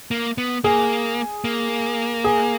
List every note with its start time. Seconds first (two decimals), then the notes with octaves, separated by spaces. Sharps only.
0.11 A#3
0.38 B3
0.64 A#3 G#4
1.44 A#3
2.24 G#4